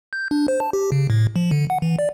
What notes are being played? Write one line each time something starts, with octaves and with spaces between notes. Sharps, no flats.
G6
D4
C5
A5
G4
C#3
A2
F3
D3
F#5
E3
D5